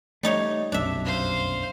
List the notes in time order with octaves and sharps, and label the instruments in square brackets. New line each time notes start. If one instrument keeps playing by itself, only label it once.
[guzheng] G3 D#4 C#5 [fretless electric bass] A3
[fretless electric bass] F1 B1 F#2 [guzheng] D4 E5
[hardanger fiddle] C5 F5